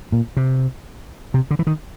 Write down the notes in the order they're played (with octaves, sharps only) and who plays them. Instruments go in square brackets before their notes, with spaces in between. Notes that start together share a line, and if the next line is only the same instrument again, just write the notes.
[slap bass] A#2
C3
C3
D3
E3
D#3